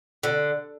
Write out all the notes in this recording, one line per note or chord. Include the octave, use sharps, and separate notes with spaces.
D3